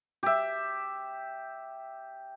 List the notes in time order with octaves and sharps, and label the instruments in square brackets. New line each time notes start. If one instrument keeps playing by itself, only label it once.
[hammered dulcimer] G4 E5